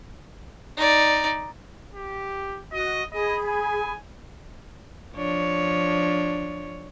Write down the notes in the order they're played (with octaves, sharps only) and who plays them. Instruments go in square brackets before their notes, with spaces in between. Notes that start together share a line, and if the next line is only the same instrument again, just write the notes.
[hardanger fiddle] D#4 D5
[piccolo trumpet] G4
[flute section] F#4 [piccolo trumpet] D#5
[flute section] G#4 B5 [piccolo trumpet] D#5
[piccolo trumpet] G#5
[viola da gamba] F3 D4 C#5